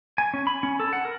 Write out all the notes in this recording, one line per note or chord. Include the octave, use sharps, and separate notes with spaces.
G#5
C#4
B5
C#4
A4
F#5
A#4